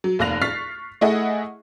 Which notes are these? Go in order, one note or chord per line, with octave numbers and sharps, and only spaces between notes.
F#3
F1 D#2 F5 F#6 A#6 F7
C#6 F6 A6 B6 C7
A3 E4 G#4 D#5 F#5